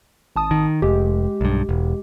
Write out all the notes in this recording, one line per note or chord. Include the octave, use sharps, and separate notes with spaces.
G#1 A5 D#6
D#3
F1 G#3 G4
B1 G2
E1